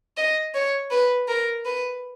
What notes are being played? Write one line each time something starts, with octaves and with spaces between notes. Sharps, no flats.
D#5
C#5
B4
A#4
B4